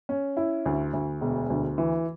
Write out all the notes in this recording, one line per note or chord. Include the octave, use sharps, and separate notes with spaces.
C#4
E4
D2
D2
E1
D2
E3